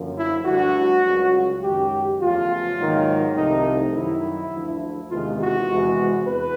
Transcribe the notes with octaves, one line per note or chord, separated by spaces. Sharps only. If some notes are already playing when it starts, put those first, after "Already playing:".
Already playing: F#2 D3 F3 A#3
E4
D2 D3 G3 F#4
C#2 C#3 F#3
F#2 D#3 G#3 G4
E2 C#3 F3 A3 F4
G#2 D#3 F#3 A#3
C2 C3 F3 A3 D#4
F#2 D#3 F#3 E4
D2 D3 F3
E2 C3 D#3 G#3 F4
F#4
E2 C3 E3 G#3
E2 B4